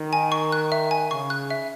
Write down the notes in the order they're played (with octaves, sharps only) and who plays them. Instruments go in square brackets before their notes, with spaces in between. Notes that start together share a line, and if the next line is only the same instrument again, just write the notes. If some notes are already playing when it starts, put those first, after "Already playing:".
Already playing: [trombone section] D#3
[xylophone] G#5
C#6
F#6
E5
G#5
[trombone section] C#3 [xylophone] C#6
[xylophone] F#6
E5